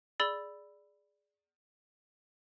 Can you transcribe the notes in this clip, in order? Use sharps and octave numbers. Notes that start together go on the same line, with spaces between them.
G#4 D5 B5 E6 A6 G7